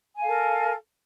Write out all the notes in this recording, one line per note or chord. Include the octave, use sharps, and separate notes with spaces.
A4 A#4 F5 G#5